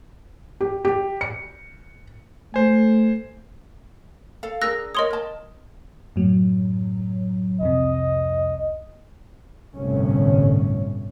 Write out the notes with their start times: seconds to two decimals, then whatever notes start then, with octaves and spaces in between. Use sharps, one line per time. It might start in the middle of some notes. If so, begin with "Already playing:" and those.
0.61 G4
0.85 G4
1.21 C#7
2.54 A3 C5 G#5
4.43 A4 F5
4.61 D4 G#4 A#4 E6 F#6 A#6
4.95 A#4 C#5 D#5 C6 D#6
5.10 A#4 A5
6.16 F#2 A2 F#3
7.61 C2 F2 C3 D#5
9.75 G1 C2 A2 C#4